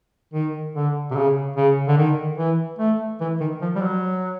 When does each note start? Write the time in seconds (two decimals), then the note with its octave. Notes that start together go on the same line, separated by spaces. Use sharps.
0.34 D#3
0.76 D3
1.10 C3
1.16 C#3
1.56 C#3
1.87 D3
1.97 D#3
2.38 E3
2.79 A3
3.20 E3
3.40 D#3
3.61 F3
3.75 G3
3.81 F#3